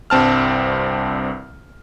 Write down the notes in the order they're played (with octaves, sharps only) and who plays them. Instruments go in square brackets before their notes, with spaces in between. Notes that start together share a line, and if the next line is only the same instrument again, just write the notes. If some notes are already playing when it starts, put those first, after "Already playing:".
[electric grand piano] C2 G2 C4 A5 F6